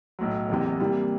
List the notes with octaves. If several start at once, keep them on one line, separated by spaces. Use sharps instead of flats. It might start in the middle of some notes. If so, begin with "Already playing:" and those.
B1 A2 F#3
F#1 E2 C3 E3
C3 E3 G3 A#3